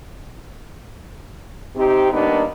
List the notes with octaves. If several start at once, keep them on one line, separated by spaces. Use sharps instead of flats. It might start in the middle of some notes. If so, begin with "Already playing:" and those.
C3 C4 D#4 G4
D#3 G3 A#3 B3 D4 D#4